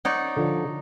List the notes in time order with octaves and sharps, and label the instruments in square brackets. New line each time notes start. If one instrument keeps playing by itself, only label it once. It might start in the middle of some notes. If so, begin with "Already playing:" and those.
[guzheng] D#4 C#5 D5 [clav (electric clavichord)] F#5
[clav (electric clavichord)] D3 F3